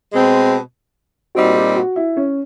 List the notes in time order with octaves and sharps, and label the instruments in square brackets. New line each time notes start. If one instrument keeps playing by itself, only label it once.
[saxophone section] B2 G#3 C4
[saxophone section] A#2 G3 C4 D#4 [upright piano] F#4
[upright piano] G4
F#4
E4
C#4